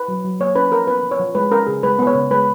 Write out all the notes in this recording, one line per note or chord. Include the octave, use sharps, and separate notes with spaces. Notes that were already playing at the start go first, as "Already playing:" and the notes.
Already playing: B4
F#3
F#3
A#3 C#5
C#4 B4
F3 A#4
B3 B4
F3
C#5
F3
G#3 B4
C#4 A#4
C#3 G#4
G#3 B4
B3 B4
C#5
C#3
G#3 B4